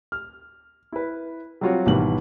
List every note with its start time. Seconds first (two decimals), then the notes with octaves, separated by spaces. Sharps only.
0.12 F6
0.92 E4 B4
1.61 F#3 G3 C4 F4 F#4 C#5
1.86 G#1 B2 D#3 E3 G3 F#7